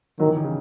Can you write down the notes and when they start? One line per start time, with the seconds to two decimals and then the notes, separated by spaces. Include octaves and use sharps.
0.20 D#3 F#3
0.28 E3
0.37 D#3
0.44 C#3